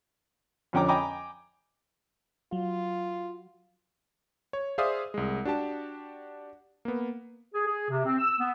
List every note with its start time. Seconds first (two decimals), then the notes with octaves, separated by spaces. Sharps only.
0.73 F2 D3 C#4 G5 A#5 D6
0.88 D#5 G5 G#5 A#5 B5 D6
2.53 F#3 F4
4.53 C#5
4.78 G#4 C5 D5 E5 F5 D#6
5.14 C2 G#3
5.45 D4 F#4 G4 A5
6.85 A#3 B3
7.55 G#4
7.67 G#4
7.90 C3
8.05 C4
8.18 E6
8.40 B3